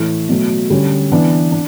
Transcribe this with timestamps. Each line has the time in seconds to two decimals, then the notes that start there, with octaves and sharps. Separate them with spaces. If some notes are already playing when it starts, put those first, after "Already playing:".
Already playing: A2 E3 A3 E4
0.29 B2 F#3 A3
0.70 D3 G3 C#4
1.12 E3 B3 D4
1.52 D4